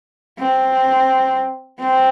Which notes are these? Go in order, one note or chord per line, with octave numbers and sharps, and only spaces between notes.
C4
C4